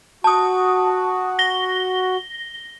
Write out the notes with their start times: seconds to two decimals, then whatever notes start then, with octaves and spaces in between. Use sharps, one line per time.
0.24 F#4 A5 D#6
1.39 A#6 G7